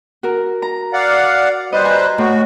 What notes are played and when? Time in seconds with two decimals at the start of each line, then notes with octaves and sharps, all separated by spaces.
0.23 F#4 A#4
0.62 A#5
0.93 D5 F5 F#5
1.73 G3 B4 C5 D#5
1.85 G#5 A#5
2.18 A2 F#4